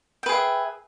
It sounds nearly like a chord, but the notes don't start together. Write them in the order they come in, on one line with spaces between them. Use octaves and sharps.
G5 B4 G#4 E5